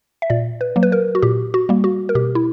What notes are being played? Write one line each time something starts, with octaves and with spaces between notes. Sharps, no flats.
E5
A#2 D5
B4
F#3 A#3
B4
A#4
F#4
A#2 G4
F#4
G3 A#3
F#4
A#4
B2 G4
E4